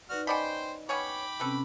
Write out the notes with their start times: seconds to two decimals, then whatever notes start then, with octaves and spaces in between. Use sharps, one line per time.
0.09 D#4 F#4 B4 D5 F6
0.27 C#4 C5 D5 D#5 F#5 G5 A5 B5
0.89 B3 C#4 C#5 G5 B5 D6
1.40 C3 C4 C#4 A4 B4